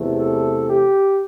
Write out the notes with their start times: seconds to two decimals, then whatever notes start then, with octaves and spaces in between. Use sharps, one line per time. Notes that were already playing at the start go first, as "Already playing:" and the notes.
Already playing: E2 C3 E3 A3
0.18 A4
0.69 G4